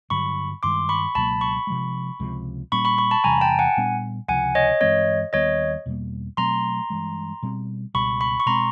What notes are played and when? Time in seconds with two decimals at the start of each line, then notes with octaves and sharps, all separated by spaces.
0.10 G2 D3 F#3 B5 C#6
0.63 G2 D#3 G#3 C6 D6
0.89 B5 C#6
1.15 C#2 B2 F#3 A#3 A5 B5
1.41 B5 C#6
1.67 C3 F3 G#3
2.20 C#2 C3 F3 G#3
2.72 A#2 G3 A#3 C#4 B5 C#6
2.85 B5 C#6
2.98 B5 C#6
3.11 A5 B5
3.24 E2 C3 E3 G3 G#5 A#5
3.41 G5 A5
3.59 F#5 G#5
3.77 A#2 G3 B3 D4
4.28 C#2 C3 F3 F#5 G#5
4.55 C#5 D#5
4.81 G2 E3 G#3 C4 C#5 D#5
5.33 D#2 D#3 G3 B3 C#5 D#5
5.86 E2 B2 G3 A#3
6.37 B2 F#3 A3 C4 A#5 C6
6.90 G2 E3 G#3
7.43 B2 G3 C4
7.94 C#2 B2 G3 B5 C#6
8.21 B5 C#6
8.40 C#6
8.46 B2 G#3 C4 A#5 C6